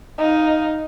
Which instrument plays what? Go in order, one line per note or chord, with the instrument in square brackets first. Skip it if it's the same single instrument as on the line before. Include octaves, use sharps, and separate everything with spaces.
[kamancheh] D#4 F5